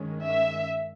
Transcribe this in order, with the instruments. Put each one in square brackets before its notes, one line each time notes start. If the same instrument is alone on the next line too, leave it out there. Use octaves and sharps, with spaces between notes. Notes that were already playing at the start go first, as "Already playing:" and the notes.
Already playing: [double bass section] G2 D#3 G#3 C#4
[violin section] E5